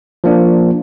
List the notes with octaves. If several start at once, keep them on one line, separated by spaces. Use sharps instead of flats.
F3 A#3 D4